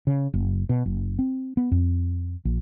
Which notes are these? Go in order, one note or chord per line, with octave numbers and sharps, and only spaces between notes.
C#3
F#1
B2
F#1
C4
B3
F2
A#1